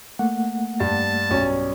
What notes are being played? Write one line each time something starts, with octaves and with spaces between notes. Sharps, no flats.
A3 A#3 F#5
G2 A5
B1 G2 C#4